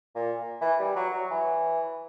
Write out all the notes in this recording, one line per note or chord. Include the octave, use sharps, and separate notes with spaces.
A#2
E3
G3
F#3
F#3
E3